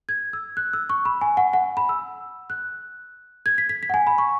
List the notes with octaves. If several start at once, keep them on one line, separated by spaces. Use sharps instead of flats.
G#6
E6
F#6
E6
C#6
B5
G#5
F#5
F#5
B5
E6
F#6
G#6
B6
B6
B6
F#5
G#5
B5
C#6